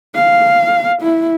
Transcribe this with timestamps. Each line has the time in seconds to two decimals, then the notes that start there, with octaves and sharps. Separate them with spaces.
0.15 F5
1.02 E4